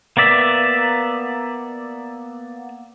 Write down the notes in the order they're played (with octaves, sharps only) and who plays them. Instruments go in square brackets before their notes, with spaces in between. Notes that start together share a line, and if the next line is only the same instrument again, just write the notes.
[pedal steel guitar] A#3 B3 D5 E5